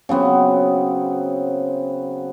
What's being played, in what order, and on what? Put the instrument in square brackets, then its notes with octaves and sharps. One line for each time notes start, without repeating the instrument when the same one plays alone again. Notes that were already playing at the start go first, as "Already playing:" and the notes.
[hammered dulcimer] C#3 F#3 B3 C4